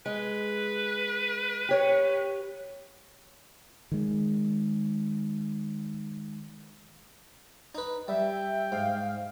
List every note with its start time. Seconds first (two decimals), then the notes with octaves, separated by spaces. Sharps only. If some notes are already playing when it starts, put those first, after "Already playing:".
0.06 G#3 B4
1.69 G4 C#5
3.92 D#3 G#3
7.75 D#4 B4
8.08 G3 E5 G5
8.72 G#2 F5